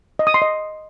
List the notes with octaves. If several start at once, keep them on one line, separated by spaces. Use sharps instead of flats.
D#5
D#6
C6
D#5